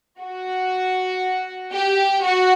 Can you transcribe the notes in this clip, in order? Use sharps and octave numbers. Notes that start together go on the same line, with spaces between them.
F#4
G4
F#4